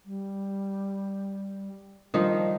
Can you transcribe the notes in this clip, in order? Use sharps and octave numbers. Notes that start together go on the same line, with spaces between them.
G3
D#3 F3 G3 D4 D#4